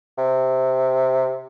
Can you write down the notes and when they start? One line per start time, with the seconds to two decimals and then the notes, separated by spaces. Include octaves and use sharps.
0.18 C3